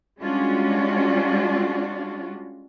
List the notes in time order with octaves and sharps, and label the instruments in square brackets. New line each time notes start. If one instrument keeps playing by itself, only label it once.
[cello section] G3 G#3 C#4 D4 F4 F#4